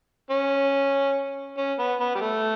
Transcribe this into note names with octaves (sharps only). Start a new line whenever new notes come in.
C#4
C#4
B3
B3
G3
A3